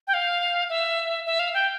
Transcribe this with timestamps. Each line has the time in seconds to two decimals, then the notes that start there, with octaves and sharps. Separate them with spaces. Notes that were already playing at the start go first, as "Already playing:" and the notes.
0.07 G5
0.14 F5
0.69 E5
1.26 E5
1.39 F5
1.54 G5